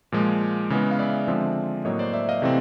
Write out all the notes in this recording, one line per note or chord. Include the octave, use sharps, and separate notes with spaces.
A#2 F3 G#3
C#3 E3 G#3 B3
F5
D5 E5
D3 F3 G#3 C4 D5 E5
A2 F#3 A#3 C#5 D#5
C5 D5
D5 E5
D#5 F5
C3 E3 A3 C4